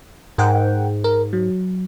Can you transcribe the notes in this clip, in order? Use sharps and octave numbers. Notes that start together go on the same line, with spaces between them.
G#2 A#4 F#5 G5
A#4
F#3